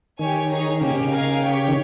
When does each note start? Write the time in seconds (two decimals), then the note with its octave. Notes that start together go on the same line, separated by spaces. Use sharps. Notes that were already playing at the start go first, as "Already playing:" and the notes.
0.19 D#3 G4 C#5 G#5
0.50 D#4 G#4 C#5
0.81 C#3 A#3 C#4 G4
0.91 C3
1.01 C#3
1.11 D#4 A#4 F5 G#5
1.43 G4 C#5 G5
1.68 D#3